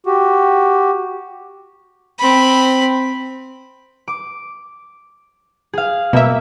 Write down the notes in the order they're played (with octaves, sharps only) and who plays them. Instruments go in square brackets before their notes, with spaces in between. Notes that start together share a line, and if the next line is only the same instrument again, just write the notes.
[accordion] F#4 G4
[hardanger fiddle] C4 B5
[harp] D6
G#4 F5
[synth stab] B2 E5 [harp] A#3